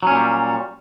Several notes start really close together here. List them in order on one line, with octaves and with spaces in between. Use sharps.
F#3 C#4 A#2 G3